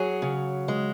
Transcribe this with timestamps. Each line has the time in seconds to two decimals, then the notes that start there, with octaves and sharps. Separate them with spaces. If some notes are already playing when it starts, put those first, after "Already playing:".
Already playing: F#3 G#4
0.22 C#3
0.68 G#3